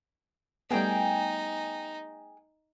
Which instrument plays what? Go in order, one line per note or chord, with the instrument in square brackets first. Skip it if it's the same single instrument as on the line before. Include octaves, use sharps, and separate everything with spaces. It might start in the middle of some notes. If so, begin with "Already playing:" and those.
[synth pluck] G3 A3 B3 [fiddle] D#4 [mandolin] G#4 G5